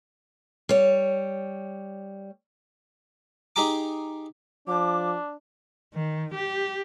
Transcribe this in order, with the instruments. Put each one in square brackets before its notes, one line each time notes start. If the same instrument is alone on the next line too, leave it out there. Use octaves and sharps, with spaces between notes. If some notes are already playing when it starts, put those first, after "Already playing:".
[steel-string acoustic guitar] G3 C#5
[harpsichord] D#4 G4 G#4 G#5 A#5 D6
[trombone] F3 [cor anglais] D4 [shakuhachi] D6
[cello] D#3
G4